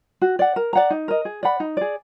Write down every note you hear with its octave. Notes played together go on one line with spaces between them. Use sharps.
F#4
D5 F#5
A#4
D5 F#5 A#5
D#4
A#4 D#5
G#4
D5 F#5 B5
D#4
G#4 D5